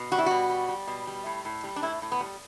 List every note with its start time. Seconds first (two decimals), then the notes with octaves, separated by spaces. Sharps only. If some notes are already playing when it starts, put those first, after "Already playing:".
Already playing: B2
0.12 G3 F#4
0.18 E4
0.26 B2 F#4
0.49 G3
0.68 G3
0.87 B2
1.07 G3
1.26 A2
1.45 A2
1.64 G3
1.76 D4
1.83 A2 E4
2.02 A2
2.12 B3
2.20 G3